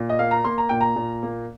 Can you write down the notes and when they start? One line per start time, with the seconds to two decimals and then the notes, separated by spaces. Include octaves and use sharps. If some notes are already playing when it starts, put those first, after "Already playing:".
Already playing: A#2
0.09 D#5
0.19 A#3 F5
0.31 A#5
0.44 A#3 C6
0.58 A#5
0.69 A#2 G5
0.81 A#5
0.96 A#2
1.23 A#3